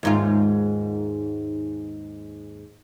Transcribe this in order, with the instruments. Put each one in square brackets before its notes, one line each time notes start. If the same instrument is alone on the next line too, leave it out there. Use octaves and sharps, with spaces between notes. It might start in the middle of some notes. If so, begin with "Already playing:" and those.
[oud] D#2 G#2 F4